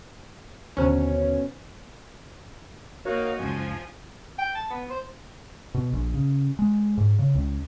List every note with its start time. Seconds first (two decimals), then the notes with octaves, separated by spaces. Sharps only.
0.77 D#2 B2 D3 C#4 D#4 C5 A#5
3.05 A#3 D#4 F#4 A#4 C#5 F5
3.39 C#2 F#2 F3 G#5
4.38 G5
4.55 A5
4.70 B3
4.90 C5
5.74 B2
5.93 A#1
6.14 C#3
6.59 G#3
6.97 G#2
7.19 C#3
7.35 C#2